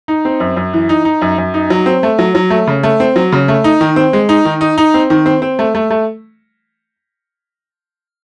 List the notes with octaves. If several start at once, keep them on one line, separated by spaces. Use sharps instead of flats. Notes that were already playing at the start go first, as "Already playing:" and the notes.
D#4
C4
F#2
F#2
E3
D#4
D#4
F#2
F#2
D#4
F#3
C4
A3
F#3
F#3
A3
C#3
A3
C4
F#3
C#3
A3
D#4
D#3
C4
G#3
D#4
D#3
D#4
D#4
C4
D#3
C4
C4
A3
A3
A3